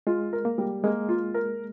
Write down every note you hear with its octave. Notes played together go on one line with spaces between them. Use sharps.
G#3 F4
A#4
A#3
G3
G#3 A#3
F4
A#4